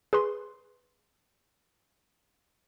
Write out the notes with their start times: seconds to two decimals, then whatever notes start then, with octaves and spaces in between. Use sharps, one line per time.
0.13 G#4 B4 C6